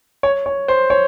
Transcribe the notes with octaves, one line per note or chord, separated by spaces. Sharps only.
C#5
C#5
C5
C#5